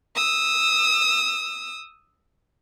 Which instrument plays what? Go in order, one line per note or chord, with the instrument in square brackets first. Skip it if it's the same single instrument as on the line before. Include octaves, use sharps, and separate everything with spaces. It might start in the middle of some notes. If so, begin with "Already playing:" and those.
[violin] D#6 E6